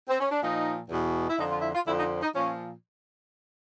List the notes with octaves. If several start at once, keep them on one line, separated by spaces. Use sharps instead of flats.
C4
C#4
D4
A#2 F3 D#4
E2 B2
E4
F2 D3 F3 D#4
F4
E4
F4
F2 D3 F3 E4
D#4
D#4
A#2 F3 C#4